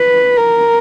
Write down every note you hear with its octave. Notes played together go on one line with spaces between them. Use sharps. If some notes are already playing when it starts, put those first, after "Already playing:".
Already playing: B4
A#4